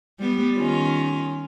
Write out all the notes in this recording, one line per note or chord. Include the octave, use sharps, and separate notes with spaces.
G3 B3
D#3 C#4 F4